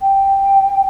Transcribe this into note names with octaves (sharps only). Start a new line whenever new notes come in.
G5